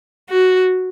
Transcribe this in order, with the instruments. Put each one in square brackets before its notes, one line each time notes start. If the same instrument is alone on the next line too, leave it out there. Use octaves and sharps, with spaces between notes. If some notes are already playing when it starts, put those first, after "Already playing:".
[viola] F#4